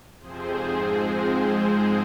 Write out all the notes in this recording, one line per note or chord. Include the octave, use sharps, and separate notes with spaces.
F2 C3 F3 C4 G#4 C5
G#2 F3 C4
G#2 F3 G#3 C4